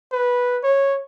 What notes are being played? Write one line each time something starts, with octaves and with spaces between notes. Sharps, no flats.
B4
C#5